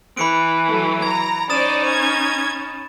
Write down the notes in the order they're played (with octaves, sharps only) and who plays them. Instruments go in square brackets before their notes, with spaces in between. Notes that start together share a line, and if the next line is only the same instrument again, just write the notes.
[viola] E3 [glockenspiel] B5 C#7 D7
[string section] F#3 A3
[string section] A#5 [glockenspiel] G#6
[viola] C#4 D#4 [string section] C5 D5 [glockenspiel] D#6 A6 E7
[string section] G#6